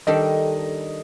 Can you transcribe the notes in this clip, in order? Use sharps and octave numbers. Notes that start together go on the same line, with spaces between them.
D#3 G3 D4 A4 D#5